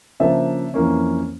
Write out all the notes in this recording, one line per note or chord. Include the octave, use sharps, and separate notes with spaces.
C#3 F3 A#3 D4 E5
F2 E3 A#3 C#4